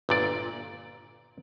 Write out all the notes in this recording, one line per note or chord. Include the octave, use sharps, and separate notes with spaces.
G1 A#2 D5